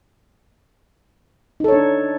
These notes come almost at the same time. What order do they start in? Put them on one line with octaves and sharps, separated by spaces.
D#4 A4 C#5 D4